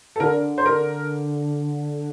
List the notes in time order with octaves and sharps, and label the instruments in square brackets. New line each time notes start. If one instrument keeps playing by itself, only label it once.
[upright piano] A4
[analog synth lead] D3 [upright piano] A#4
[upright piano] C5
A#4